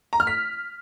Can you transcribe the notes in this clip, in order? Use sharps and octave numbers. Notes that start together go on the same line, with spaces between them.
A#5
F6
B6